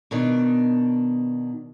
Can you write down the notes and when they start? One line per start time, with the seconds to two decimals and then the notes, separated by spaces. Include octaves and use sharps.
0.11 B2 D#3 D4